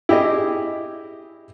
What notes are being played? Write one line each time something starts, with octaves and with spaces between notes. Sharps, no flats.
E4 G4 G#4 D#5